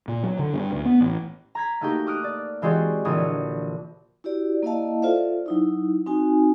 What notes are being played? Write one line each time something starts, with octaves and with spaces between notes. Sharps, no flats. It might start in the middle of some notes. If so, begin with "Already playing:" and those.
A#2
F#3
D3
G2
D2
B3
A1
A#5 G#6 B6
A3 A#3 D#4 F#4 G4
D6 D#6 F6 F#6 D7
D5
E3 G#3 C4 F#4 G4 D5
A#1 D3 E3 C#5 D#6
E4 F#4 G4 D5
A#3 E4 D5 D#5 F5 A5
F4 A4 C5 D5 E5 F5
F#3 D#4 E4
C4 D#4 F#4 G#5